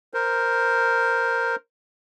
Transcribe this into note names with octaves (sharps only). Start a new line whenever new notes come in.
A#4 C5